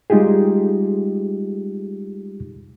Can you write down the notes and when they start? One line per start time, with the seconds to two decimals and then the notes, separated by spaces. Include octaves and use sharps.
0.10 G3 G#3 D#4 F4 G4 G#4